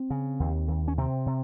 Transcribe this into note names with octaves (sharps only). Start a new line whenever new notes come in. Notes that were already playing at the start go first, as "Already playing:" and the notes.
Already playing: C4
C#3
D#2
D#2
C#4
C3 C4
C3